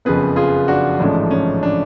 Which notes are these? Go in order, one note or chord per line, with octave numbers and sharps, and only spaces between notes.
F#1 F2 C#3 F3 B3 G#4 B4
F4 G#4
D4 F#4
A1 G#2 F3 A3 C#4 D4
C#4
D4